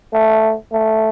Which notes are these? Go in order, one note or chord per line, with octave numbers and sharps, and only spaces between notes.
A3
A3